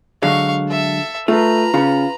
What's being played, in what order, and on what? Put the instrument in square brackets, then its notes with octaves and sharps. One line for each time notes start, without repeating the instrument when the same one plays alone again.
[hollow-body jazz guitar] D3 F#3 G#3 [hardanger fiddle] F5 C#6
[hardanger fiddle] A4 E5
[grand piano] A3 [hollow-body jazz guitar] F4 [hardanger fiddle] B4 A#5
[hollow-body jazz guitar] C#3 C#4 [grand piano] F4